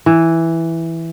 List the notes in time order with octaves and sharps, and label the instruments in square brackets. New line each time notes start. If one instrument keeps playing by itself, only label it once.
[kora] E3